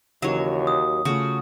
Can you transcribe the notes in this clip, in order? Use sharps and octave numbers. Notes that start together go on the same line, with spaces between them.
D#2 C#3 E3 F#3 C#4 C#5
D#6
C#3 A3 F4 F#4